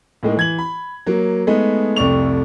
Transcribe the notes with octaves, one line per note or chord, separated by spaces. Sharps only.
A2 G#3 A#3 D#4
E3 G#6 F#7
B5
F#3 A#3
G#3 A3 B3 D#4
C2 F2 A3 D5 C#6 F7